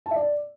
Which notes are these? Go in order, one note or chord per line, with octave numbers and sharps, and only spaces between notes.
A5
E5
D5